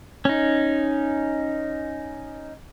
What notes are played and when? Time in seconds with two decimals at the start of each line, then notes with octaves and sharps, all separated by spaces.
0.25 C#4 D#4